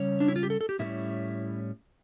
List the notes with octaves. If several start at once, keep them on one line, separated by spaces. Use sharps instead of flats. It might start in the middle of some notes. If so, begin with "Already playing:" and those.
Already playing: C#3 G3 C#4 C#5
D4
E4
F4
G4
A4
A4
G4
A2 G3 A#3 C#4 E4